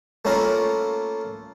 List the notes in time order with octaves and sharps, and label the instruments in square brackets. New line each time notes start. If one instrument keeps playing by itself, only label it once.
[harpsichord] A3 A#3 C#4 E4 F4 A#4